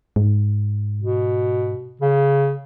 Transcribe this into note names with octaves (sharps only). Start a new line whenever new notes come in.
G#2
B2
C#3